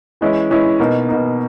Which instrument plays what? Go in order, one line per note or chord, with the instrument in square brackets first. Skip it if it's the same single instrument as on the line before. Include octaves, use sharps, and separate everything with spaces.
[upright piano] E3 G#3 C#4 E4
E3 G#3 C#4 E4
B2 A#3 D#4
B2 A#3 D#4